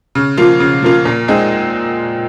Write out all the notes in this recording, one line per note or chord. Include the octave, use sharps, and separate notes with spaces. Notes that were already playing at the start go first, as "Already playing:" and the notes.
C#3
F3 A#3 F4
C#3
F3 A#3 F4
A#2
G#3 C4 D#4 G#4